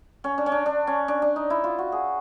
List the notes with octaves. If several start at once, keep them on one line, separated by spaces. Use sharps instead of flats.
C#4
D4
C#4
D4
D4
C#4
D4
D4
D#4
E4
F4
F#4
G#4